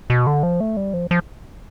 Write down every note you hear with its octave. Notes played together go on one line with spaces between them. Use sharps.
B2
D3
F3
A3
G3
F3
F3